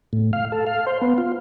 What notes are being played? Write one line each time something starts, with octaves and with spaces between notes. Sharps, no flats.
A2
F5
A4
F5
C5
B3
F4